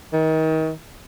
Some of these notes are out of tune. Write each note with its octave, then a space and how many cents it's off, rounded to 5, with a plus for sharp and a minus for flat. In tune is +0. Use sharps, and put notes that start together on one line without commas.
D#3 +30